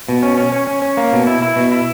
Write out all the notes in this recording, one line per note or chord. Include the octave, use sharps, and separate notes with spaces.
B2
C#4
C#4
C#4
C#4
C#4
A#3
B2
E4
E4
B2
E4